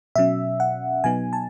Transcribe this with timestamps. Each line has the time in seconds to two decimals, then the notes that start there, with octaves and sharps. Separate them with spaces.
0.16 B2 F#3 C#4 E5
0.60 F#5
1.04 B2 F#3 B3 D#4 G#5
1.33 A5